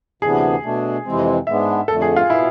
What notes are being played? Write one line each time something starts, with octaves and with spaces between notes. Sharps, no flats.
D2 C3 E3 B3 D4 G#4
B2 A3 D4
F2 C3 E3 G#3 C4
G#2 G#3 B3 D4 E5
F2 D3 A3 A4
G#4
F4
B2 B3 E4